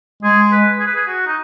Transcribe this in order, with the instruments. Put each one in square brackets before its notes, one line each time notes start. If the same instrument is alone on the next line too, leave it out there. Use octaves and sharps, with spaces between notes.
[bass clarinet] G#3 [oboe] G#4
[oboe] B4
G#4
B4
G#4
F#4
D#4